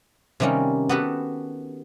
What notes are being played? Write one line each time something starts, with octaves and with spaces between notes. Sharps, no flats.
C3 D#3 G3 A#3 C#4
B3 F#4 G4 A4 B4